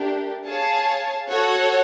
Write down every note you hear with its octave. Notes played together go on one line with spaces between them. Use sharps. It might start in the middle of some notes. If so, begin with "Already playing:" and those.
Already playing: A3 D4 G4 A#4
G#4 C#5 F5 A5
F#4 A4 C#5 F#5